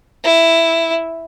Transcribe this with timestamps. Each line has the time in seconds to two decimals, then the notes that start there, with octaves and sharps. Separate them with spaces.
0.24 E4